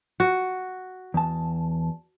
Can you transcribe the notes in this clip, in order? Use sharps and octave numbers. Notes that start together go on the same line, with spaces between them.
F#4
E2 A5